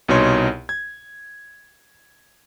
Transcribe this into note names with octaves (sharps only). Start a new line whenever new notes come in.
C2 B2 D#4 C#5 C6
G#6